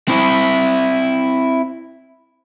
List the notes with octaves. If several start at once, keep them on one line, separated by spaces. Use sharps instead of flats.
C4 E4